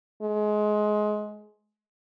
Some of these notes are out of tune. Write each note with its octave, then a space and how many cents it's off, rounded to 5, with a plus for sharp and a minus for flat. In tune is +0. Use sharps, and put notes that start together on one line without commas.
G#3 +20